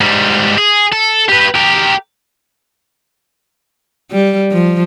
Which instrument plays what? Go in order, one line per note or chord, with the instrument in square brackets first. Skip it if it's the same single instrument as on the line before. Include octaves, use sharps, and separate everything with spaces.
[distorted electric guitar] G#2 G3
G#4
A4
G4 B4
G4 A#4
[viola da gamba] G3
F3